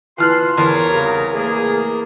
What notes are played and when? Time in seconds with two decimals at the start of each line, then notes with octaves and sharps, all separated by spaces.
0.18 E3 F4 A5 C6 F6 F#6
0.58 E2 A#4 C#5
0.89 C2 C#3 A#5
1.34 A3 A#3 G#4 A#4